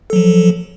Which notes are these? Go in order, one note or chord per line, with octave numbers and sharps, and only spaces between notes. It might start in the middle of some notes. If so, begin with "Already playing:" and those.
F3 F#3 A4